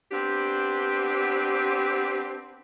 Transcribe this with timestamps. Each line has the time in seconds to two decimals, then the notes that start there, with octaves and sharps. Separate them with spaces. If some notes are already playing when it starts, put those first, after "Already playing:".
0.11 B3 C4 D4 G4